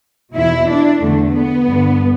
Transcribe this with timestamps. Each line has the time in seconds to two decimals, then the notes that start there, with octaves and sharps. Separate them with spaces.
0.35 E2 B2 E4
0.69 D4
1.02 E2 D3 A3
1.34 B3
1.68 G2 D3